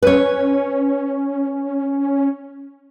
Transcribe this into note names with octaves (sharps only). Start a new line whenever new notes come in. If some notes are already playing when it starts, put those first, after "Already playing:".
C#4 B4 C#5